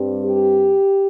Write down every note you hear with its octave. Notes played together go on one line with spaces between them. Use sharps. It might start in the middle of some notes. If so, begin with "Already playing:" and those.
Already playing: G2 G3 C4
G4